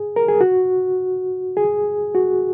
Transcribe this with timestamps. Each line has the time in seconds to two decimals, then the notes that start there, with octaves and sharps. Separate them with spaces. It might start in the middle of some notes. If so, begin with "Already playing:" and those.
Already playing: G#4
0.16 A#4
0.29 G#4
0.41 F#4
1.57 G#4
2.15 F#4